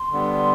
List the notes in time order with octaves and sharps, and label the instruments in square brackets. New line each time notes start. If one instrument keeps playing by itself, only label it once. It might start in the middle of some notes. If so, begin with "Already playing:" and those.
Already playing: [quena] C6
[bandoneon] D3 G3 B3